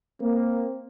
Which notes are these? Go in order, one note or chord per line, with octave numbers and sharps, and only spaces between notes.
A#3 C4